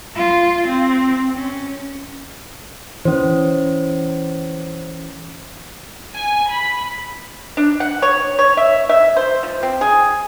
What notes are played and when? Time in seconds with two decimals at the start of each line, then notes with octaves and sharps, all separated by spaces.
0.16 F4
0.67 C4
1.35 C#4
3.05 E3 C#4 C5
6.14 G#5
6.48 B5
7.57 D4
7.80 F#5
8.02 C#5
8.39 C#5
8.57 E5
8.89 E5
9.16 C5
9.43 F3
9.63 C4
9.81 G#4